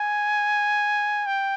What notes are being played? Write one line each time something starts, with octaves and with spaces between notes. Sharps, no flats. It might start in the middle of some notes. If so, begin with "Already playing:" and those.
Already playing: G#5
G5